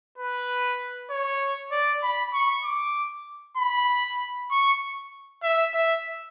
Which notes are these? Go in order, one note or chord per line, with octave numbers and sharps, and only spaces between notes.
B4
C#5
D5
B5
C#6
D6
B5
C#6
E5
E5